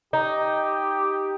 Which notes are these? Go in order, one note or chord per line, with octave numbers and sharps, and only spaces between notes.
D#4 G4